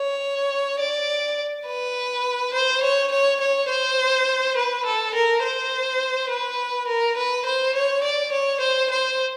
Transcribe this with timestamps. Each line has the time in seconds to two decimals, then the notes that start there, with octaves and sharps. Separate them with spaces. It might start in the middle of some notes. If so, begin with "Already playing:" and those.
Already playing: C#5
0.80 D5
1.67 B4
2.54 C5
2.83 C#5
3.12 C#5
3.40 C#5
3.69 C5
4.56 B4
4.85 A4
5.14 A#4
5.43 C5
6.30 B4
6.87 A#4
7.17 B4
7.45 C5
7.75 C#5
8.03 D5
8.32 C#5
8.61 C5
8.90 C5